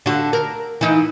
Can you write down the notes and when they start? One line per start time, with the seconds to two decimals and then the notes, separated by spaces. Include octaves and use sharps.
0.06 D3 F#4
0.33 A#4
0.81 E3 D#4